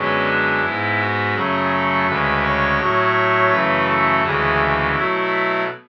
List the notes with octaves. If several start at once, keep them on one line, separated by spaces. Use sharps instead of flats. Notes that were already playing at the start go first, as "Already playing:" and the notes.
Already playing: F#2 D3 G#3 B3 C#4
D4
G#2 G#3 B3 E4
F#4
F#2 C#3 F#3 A3 G#4
A4
D2 C#3 G#3 B4
C#5
A2 F#3 A3
F#2 C#3 E3 A3 B4
A4
D2 C#3 E3 G#3 G#4
B2 F#3 A3 E4